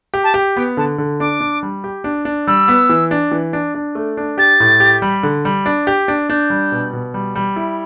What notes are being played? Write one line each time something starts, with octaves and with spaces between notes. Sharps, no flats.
G4
A5
G4
B3 G5
D3 A5
D3
D4 D6
D4
G3
G4
D4
D4
G3 E6
B3
E3
D4
E3
D4
D4
A3
D4
G4 A6
A2
G4
G3
D3
G3
D4
G4
D4
D4 G6
G3
B2
B2
G3
G3
E4